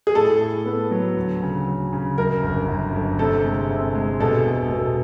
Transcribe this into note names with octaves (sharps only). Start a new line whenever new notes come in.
G#4
A2 A4
A2
B3
F#3
D2
C#3
F#3
C#3
F#2 A#4
G1
F#2
G1
C3 A4
G#3
C3
G#3
B2 A4
E1
B2